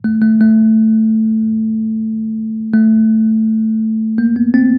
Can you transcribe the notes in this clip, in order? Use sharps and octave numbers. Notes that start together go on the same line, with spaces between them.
A3
A3
A3
A3
A#3
B3
C4